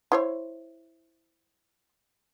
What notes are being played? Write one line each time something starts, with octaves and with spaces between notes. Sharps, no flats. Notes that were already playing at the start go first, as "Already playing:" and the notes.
E4 C5 C#5